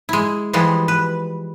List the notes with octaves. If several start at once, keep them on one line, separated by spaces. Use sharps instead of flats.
G#3 E4
E3 F3 G3 G#3
B4